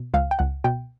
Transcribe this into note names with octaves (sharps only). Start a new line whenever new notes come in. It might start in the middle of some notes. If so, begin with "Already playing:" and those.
Already playing: B2
C#2 F5
G5
C#2 F#5
B2 G5